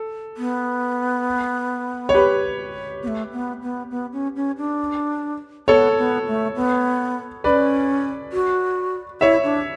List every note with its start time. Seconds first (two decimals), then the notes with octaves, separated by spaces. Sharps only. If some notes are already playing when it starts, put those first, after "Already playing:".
Already playing: A4
0.37 B3
2.09 C#5
2.14 G4 B4
3.03 B3
3.08 A3
3.32 B3
3.62 B3
3.91 B3
4.13 C#4
4.36 C#4
4.58 D4
5.68 B3 A4 C#5
5.98 B3
6.27 A3
6.56 B3
7.44 D4 B4 D5
7.49 C#4
8.33 F#4
9.21 E4 C#5 E5
9.44 D4